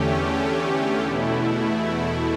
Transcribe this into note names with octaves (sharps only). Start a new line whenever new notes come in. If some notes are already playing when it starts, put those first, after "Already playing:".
Already playing: E2 D3 A3 C#4 G4
E2 B2 A3 E4